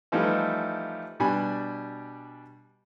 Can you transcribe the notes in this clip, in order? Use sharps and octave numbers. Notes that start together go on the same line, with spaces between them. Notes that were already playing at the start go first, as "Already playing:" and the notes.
E3 F3 G3 A3 D#4 E4
B2 G3 D4 G#5 B5